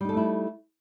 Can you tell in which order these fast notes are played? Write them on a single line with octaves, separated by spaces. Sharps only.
G3 D#4 A4 A3 E4